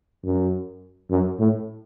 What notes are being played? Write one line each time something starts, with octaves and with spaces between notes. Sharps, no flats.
F#2
F#2
A2